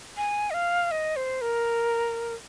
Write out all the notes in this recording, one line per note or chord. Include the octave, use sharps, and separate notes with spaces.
G#5
D#5
F5
D#5
C5
A#4